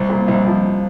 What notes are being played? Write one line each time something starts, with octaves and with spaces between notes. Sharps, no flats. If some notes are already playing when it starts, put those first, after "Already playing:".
Already playing: C2
A#2
C2
F3